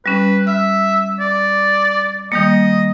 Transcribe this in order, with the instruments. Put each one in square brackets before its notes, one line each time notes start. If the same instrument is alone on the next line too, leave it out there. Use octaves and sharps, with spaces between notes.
[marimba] G3 C#4 [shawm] B4
[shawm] E5 [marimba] F6
[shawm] D5
[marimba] D#3 G3 A#3 [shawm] D#5